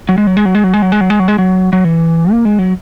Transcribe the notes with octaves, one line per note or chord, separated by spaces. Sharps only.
F#3
G#3
F#3
G#3
F#3
G#3
F#3
G#3
F#3
G#3
F#3
G#3
F#3
G#3
F#3
F#3
E3
A#3
G#3
F#3